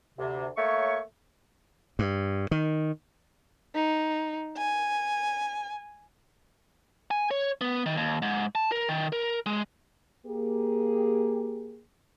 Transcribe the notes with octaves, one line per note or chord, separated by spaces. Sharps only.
D2 C3
A3 A#3 C#5 C#6
G2
D#3
D#4
G#5
G#5
C#5
B3
D#3
D#2
G#2
A5
A#4
D#3
A#4
G#3
A#3 G4 G#4